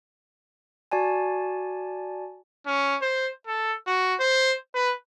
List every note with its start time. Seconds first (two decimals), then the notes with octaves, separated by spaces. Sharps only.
0.91 F#4 D5 G#5 A5
2.67 C#4
3.02 C5
3.47 A4
3.87 F#4
4.20 C5
4.75 B4